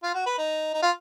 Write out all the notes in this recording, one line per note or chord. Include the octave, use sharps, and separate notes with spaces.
F4
F#4
B4
D#4
D#4
F4